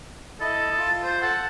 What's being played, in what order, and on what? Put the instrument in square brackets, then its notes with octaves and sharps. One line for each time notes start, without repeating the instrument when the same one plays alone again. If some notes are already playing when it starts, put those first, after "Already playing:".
[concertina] E4 D#5 [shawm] A4
[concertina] F4
[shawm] C5
[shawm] A4 [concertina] F#5